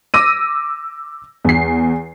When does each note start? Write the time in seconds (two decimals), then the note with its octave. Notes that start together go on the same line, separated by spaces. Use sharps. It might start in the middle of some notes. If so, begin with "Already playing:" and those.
0.14 D6 E6 A#6 D#7
1.44 E2 C7